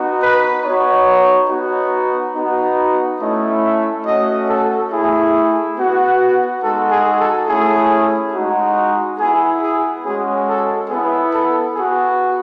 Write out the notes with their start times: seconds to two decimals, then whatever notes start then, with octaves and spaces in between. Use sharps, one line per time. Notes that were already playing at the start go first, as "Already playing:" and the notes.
Already playing: B3 D#4 F#4
0.21 B4
0.64 B3 D#4 F#4 C#5
1.49 B3 D#4 F#4
2.35 B3 D#4 F#4
3.20 A3 C#4 E4 D#5
3.63 E5
4.05 A3 C#4 F#4 D#5
4.48 A4
4.91 A3 E4 G#4
5.77 B3 F#4
6.62 G#3 D#4 F#4 A4
6.91 G#4
7.19 A4
7.48 A3 C#4 E4 G#4
8.33 G#3 D#4 F#4
9.18 B3 E4 G#4
9.61 G#4
10.03 G#3 C#4 F#4 G#4
10.47 A4
10.89 B3 E4 G#4
11.32 A4
11.75 B3 F#4 G#4